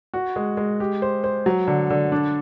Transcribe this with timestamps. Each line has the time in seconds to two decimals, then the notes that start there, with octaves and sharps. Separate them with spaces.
0.14 F#4
0.36 G#3
0.57 G#3
0.80 G4
1.02 C5
1.24 C5
1.46 F#3
1.67 D3
1.90 D3
2.12 D4